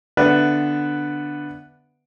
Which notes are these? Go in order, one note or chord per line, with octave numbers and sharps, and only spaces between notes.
D3 B3 B4 D5 E5